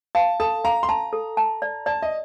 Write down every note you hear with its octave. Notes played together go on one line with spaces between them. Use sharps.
F5 A5
A4 A5
F5 A#5
C6
A5 A#5
A4
A5
D5
D5 A5
D#5